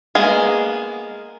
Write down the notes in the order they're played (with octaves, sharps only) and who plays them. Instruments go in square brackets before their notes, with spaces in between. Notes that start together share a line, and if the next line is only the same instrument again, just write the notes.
[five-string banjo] G#3 A#3 B3 G#4